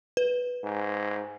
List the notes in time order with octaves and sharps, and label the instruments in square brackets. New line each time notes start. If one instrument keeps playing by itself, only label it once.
[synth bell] B4
[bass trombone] G#2